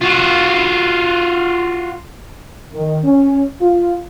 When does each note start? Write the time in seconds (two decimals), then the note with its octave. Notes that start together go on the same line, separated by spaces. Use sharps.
0.02 F4 F#4
2.73 D#3
3.04 C#4
3.61 F4